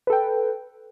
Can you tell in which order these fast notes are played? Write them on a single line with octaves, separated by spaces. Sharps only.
B4 A4 G5